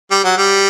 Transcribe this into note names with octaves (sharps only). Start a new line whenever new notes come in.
G3
F#3
G3